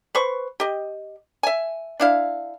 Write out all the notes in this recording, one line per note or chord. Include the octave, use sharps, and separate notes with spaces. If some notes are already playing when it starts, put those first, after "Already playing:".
B4 C5 C#6
G4 D#5
E5 G#5
D4 E4 F5